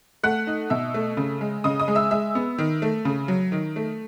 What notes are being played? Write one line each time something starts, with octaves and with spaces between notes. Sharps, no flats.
A3 F#5 F#6
D#4
B2 E5 E6
A3
C#3
G#3
C#3 D#5 D#6
D#5 D#6
G#3
E5 E6
G#3 E5 E6
B3
D#3
A3
C#3
F#3
D#3
A3